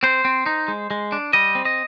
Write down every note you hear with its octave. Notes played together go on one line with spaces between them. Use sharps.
C4 C5
C4
D#4
G#3
G#3
D4
G3 D#5
C4
D#5